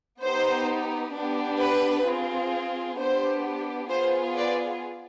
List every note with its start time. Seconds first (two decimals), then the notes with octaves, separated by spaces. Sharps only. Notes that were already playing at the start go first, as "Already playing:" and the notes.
0.21 B3 D#4 G4 C5
1.14 B3 D4 G4
1.59 B4
2.05 C4 F4 G#4
2.98 B3 D4 G4 C5
3.89 B3 F4 G#4 C5
4.36 B4 D5